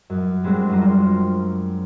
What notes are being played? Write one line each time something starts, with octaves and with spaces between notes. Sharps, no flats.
F#2
G3 G#3 C4 D4 F#4
F#2 F4 C5 A#5